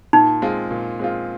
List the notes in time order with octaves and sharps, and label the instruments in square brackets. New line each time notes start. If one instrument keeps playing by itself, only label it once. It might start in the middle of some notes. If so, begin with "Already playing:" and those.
[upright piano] A#2 [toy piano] D#4
[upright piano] G#3 C4 F4
A#2
G#3 C4 F4